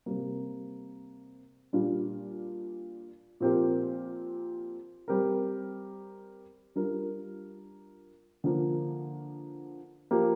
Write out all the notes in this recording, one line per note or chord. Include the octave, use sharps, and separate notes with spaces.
C3 G3 A#3
A#2 G3 D4 F4
A#2 F3 C4 G4 A#4
G3 C4 G4 A#4
G3 D4 F4 A#4
D3 F3 A#3
F3 A#3 G4 A#4